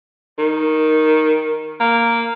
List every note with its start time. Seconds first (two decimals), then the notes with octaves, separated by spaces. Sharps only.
0.38 D#3
1.80 A#3